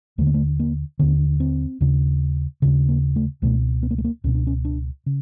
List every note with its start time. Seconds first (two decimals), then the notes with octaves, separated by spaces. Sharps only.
0.18 D#2 D3 A3
0.27 A#3
0.34 A3
0.60 A#3
0.99 D#2 D3 B3
1.40 C4
1.80 D#2 C#3
2.62 D#2 C#3
2.88 A#3
3.16 A3
3.42 C#2 B2 A3
3.83 B3
3.91 A#3
3.98 A3
4.04 A#3
4.24 C#2 B2 C#4
4.35 D4
4.47 C#4
4.65 D4
5.06 C#3